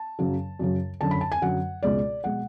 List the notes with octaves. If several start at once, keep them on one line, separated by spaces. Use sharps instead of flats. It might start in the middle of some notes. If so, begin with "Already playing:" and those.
Already playing: A5
F#2 C#3 F#3
F#2 C#3 F#3
F#2 D3 F#3 A5
B5
A5
G#5
F#2 D3 F#3 F#5
C#2 B2 G#3 D5
B2 G#3 F#5